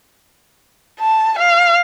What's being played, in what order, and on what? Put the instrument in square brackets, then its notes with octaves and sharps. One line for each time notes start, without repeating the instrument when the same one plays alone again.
[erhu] A5
F5